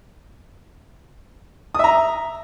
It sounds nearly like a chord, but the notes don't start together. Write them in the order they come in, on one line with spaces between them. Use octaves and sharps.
D#6 E5 A#5